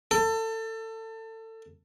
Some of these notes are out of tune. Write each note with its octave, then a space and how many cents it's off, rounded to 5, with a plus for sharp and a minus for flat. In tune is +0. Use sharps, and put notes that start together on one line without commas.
A4 +25